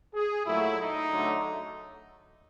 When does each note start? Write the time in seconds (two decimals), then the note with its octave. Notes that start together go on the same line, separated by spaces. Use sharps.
0.15 G#4
0.46 A#2 F#3 A3 E4
0.79 D#4
1.11 D3 F#3 A3